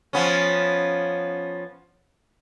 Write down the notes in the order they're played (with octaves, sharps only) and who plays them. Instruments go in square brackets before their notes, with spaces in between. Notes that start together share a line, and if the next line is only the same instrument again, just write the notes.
[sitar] F3 B3 C#4